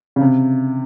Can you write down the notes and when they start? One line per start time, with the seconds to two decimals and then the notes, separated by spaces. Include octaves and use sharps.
0.16 C#3
0.21 C3